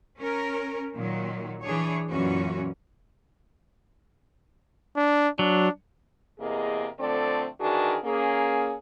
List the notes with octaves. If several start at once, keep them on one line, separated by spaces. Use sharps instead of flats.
C#4 A#4
A#2 D#3 F#3
E3 D4 G#4 C#5
F#2 A#2 E3 C#4 F#4
D4
F#3 D4
E2 C3 A#3 G#4 A#4 D#5
D3 F3 A3 C4 A4 D5
D#3 E3 D4 F#4 G#4 A#4
A#3 C#4 G#4